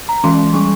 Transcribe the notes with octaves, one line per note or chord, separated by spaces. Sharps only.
A#5
E3 G#3 C#4 C6
C6
G3 C#4 C#6